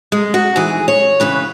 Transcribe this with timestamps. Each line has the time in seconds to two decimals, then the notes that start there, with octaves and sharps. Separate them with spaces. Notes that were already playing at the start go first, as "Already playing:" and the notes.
0.12 G#3
0.34 F#4
0.56 G#2 E3 G#4
0.88 C#5
1.20 F#2 C#3 E3 B4